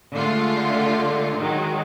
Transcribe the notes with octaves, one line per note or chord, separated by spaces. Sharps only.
D3 G#3 A3 F4
D#3 F#3 G#3